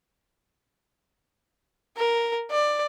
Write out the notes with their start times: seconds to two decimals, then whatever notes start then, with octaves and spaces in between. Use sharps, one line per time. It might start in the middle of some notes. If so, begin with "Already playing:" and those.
1.97 A#4
2.51 D5